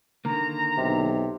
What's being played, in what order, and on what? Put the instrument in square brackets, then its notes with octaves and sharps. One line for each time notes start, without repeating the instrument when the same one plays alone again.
[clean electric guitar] D3 D#3 A#3 [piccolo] A#5
[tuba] B1 [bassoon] C3